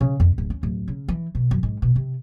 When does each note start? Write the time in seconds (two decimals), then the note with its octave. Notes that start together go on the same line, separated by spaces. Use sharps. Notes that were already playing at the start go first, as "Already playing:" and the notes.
0.01 C#3
0.20 F2
0.38 D1
0.50 C#4
0.63 D1
0.88 C#3
1.08 E3
1.35 B2
1.51 F#2
1.63 G#2
1.82 B2
1.96 C3